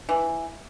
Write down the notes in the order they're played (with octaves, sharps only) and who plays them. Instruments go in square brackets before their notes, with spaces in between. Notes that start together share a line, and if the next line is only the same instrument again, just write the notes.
[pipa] E3